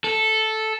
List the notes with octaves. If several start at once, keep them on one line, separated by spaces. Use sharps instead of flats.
A4